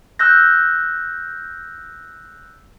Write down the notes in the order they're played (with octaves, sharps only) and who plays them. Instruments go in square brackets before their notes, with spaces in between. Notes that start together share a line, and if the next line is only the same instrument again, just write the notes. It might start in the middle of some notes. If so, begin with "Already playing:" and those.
[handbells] E6 F#6 G6 A#6